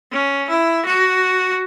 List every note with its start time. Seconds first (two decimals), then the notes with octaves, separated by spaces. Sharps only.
0.12 C#4
0.49 E4
0.86 F#4